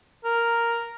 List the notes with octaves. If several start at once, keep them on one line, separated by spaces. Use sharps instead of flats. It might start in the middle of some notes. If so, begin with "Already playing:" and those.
A#4